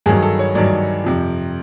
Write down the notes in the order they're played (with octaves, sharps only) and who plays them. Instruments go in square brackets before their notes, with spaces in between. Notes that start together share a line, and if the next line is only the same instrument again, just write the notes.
[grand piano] G2 D#3 F#3 G#4
A4
C#5
G2 D#3 F#3 D5
F2 C3 F3